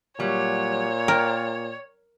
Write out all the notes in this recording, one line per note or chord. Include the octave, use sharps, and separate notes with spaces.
A#2 F#3 G3 C#5
A#4 D5 G5